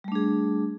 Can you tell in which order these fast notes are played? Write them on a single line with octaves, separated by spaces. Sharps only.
G3 A3 D4 G#4